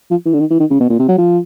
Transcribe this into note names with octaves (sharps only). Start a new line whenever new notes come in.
F3
E3
D3
D#3
E3
D#3
C#3
B2
A#2
C3
F#3
F3